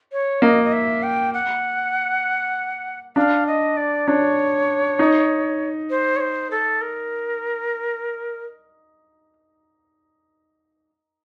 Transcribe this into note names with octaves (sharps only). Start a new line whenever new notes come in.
C#5
A#3 D#5
D#5
E5
G5
F#5
D4 F5
D#5
D5
D4 C#5
D#4
C5
C#5
C5
A4
A#4